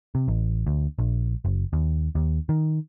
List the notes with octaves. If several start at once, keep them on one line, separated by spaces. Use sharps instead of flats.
C3
A1
D2
A#1
F#1
D#2
D#2
D#3